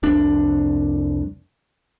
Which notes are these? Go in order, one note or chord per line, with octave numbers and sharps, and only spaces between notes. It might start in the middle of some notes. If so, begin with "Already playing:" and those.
F1 C2 D4